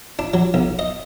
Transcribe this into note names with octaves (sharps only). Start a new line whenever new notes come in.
D4
F#3
B1
D#5